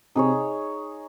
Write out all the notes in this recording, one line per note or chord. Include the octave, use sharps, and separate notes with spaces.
C3 C4 D#4 G#4 C#5